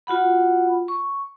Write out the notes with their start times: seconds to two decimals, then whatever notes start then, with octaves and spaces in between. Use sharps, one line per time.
0.07 F4 F#4 F#5 B5
0.88 C#6